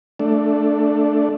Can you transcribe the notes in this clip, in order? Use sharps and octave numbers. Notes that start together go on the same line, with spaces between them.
A3 D4